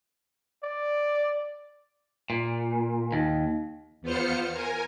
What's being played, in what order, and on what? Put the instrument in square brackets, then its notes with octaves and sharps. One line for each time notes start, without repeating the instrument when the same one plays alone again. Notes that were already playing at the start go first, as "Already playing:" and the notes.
[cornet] D5
[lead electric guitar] A#2
D#2
[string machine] E2 B3 F4 C5 F6 C#7
A#4 G#5